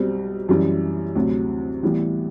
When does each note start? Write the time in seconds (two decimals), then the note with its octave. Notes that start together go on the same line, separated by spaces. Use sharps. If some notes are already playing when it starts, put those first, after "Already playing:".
Already playing: B1 B2 G3 C4
0.49 F#2 E3 G3
1.15 D2 C3 F#3
1.83 A2 E3 G3 B3